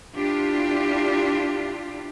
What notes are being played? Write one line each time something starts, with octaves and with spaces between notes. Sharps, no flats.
D4 E4 F4 G4